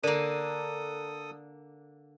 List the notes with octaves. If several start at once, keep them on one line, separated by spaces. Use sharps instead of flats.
D3 A#3 A4 A#4 D5 D#6 D#7